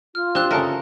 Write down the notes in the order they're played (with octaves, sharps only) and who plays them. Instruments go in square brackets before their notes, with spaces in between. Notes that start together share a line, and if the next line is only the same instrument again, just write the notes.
[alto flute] F4 [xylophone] F6
[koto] C4 [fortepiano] D4 [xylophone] G4 F#6
[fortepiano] C#3 A4 E5 [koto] A#4